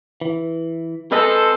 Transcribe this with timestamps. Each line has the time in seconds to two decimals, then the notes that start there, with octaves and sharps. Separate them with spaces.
0.21 E3
1.12 G#3 C4 A4 B4 C5 D#5